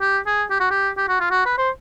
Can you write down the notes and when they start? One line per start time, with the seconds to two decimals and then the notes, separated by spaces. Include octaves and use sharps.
0.01 G4
0.27 G#4
0.51 G4
0.60 F#4
0.71 G4
0.98 G4
1.09 F#4
1.20 F4
1.31 F#4
1.46 B4
1.58 C5